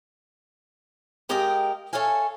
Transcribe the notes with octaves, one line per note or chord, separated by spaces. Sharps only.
G#3 G4 A#4 D#5 F5 G5
A4 C#5 E5 F5 G#5